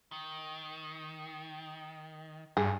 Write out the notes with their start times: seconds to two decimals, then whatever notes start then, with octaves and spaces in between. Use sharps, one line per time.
0.12 D#3
2.57 G2 G#4